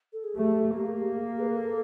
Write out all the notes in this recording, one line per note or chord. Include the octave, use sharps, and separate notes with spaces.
A4
G#4
A3 G4
A#3 G4
G#4
G4
G#4
B4
A#4
A4